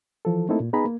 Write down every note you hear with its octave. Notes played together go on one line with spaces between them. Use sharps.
E3 F3 A4
A3 A#3 C4 D#4 E4 A4
A#2
B3 D#4 G#4 B4 A#5 B5
A#3